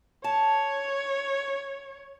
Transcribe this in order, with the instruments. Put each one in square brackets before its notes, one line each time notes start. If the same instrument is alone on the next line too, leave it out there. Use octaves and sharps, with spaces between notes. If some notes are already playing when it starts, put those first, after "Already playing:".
[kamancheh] C#5 [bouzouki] A5